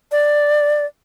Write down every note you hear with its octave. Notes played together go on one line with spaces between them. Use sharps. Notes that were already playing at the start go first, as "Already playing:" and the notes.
D5